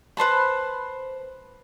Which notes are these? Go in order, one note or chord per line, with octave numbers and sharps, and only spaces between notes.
B4 C5 A5 B5